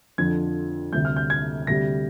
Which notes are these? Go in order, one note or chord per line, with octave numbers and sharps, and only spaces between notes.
F2 D3 F3 G#6
D2 C3 G3 G6
F6
G6
G#6
D2 C3 G3 A#6